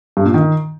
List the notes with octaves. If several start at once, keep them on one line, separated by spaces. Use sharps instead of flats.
G2
A#2
D#3